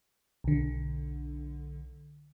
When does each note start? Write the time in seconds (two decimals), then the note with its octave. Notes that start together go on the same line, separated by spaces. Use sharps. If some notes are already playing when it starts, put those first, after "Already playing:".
0.44 B1 D3